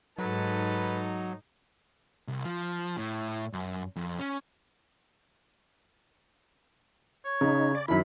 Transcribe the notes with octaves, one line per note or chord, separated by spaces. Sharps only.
G#2 F#3 D#4 A4 B4
C2
F3
A2
F#2
F2
C#4
C#5
C#3 D#4
D5
F#2 D#3 E4 B5